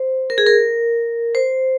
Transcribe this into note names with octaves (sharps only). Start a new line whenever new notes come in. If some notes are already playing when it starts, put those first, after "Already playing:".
Already playing: C5
A#4
G#4
A#4
C5